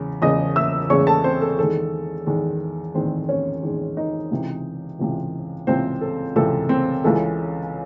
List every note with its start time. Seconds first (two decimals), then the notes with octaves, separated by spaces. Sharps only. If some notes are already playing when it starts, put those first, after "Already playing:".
Already playing: E2 C#3 G#3
0.22 E2 C#3 G#3 D#5 D#6
0.56 E5 E6
0.90 E2 C#3 G#3 C#5 C#6
1.07 A4 A5
1.24 C4 C5
1.41 A4
1.58 E2 D#3 G#3 A4
2.26 E2 D#3 G#3
2.94 E2 D#3 G#3 C4 C5
3.29 C#4 C#5
3.63 E2 D#3 G#3
3.97 D#4 D#5
4.31 C#2 C3 E3
4.99 C#2 C3 E3
5.67 C#2 C3 E3 C4 C5
6.01 A4
6.36 C#2 C3 E3 A4
6.69 C4 C5
7.04 C#2 C#3 E3 G#3 A4